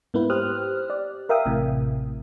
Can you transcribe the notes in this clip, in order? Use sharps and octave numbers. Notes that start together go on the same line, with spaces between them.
G#2 A#3 B3 E4 B4
G4 C5 D#6 F6 F#6
D5
A#4 E5 F5 G5 D#6
A1 A2 C3